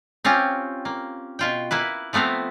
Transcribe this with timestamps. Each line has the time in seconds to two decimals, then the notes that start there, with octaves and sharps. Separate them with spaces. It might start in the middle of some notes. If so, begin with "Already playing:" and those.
0.25 C4 C#4 F4 G4
0.85 A#3
1.39 B2 F4 G5
1.71 A#3 E4 B4
2.13 F3 A3 B3 C4 F5